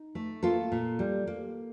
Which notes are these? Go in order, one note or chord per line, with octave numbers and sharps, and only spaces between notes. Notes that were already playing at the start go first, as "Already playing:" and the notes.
Already playing: D#4
A3
A#3 F4 A4
A#2
G3
A#3